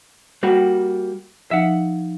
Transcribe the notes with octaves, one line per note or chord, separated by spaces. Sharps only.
G3 A#3 F#4
F3 D#4 E5 F#5